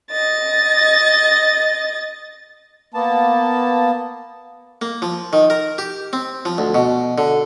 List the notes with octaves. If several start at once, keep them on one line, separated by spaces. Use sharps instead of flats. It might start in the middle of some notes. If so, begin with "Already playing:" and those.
D#5 A6
A#3 B3 A5
A#3
F3
D#3
A#4
G4
C4
F3
D2
B2
D3